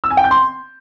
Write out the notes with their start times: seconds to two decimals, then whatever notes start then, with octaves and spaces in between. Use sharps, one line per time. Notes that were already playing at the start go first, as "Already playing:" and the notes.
0.04 E6
0.10 G#5
0.17 G5
0.24 G6
0.31 C6